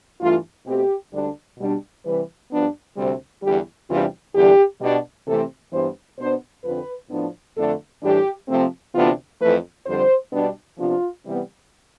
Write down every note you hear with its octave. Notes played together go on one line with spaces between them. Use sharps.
G2 E3 A3 F4
B2 A3 C4 G4
D2 D3 G3 D4
B2 G3 D4
C3 E3 G3 B4
G2 F3 B3 D4
D2 C3 G3 C4
E2 D3 G3 G4
E2 C3 E3 G3 D4 F4
E2 D3 G3 D4 G4
B2 G3 D4
C3 E3 A3 C4 A4
G2 E3 G3 B3 C5
B2 B3 D4 C5
F2 D3 F3 C4 B4
A2 F3 B3 D4
F2 D3 A3 D4 A4
A2 E3 G3 D4 G4
C3 F3 A3 C4
D2 C3 E3 B3 D4 F4
F2 E3 A3 B4
F2 D3 G3 C5
B2 G3 B3 D4
C3 F3 B3 D4 F4
C3 E3 G3 B3